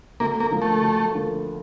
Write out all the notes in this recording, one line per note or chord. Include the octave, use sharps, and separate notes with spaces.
D2 A#3
A#3
D3 F3 A#3
A3
D2
D3 F3 A#3